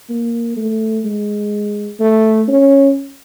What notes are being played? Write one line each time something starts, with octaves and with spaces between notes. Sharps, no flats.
A#3
A3
G#3
A3
C#4